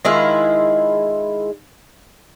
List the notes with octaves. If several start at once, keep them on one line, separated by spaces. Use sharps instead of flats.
D#3 G#3 E4 F4